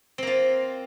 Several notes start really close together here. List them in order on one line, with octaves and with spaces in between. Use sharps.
C4 A#3 F4